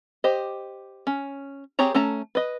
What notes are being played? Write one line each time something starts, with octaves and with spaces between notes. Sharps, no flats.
G4 C5 D#5
C#4
C4 G4 G#4 C#5 A#5
A3 C#4 A4 A5 A#5
B4 D#5